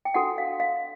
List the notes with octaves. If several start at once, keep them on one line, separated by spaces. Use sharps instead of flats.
G5
D4 F#4 A4 F#5
F5
F5